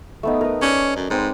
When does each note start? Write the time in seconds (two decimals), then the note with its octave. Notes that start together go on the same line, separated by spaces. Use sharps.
0.23 A3 B3 D#4
0.41 A#4 B4
0.62 C#4 C#5 D5
0.96 F#2
1.10 G#2 C4 B4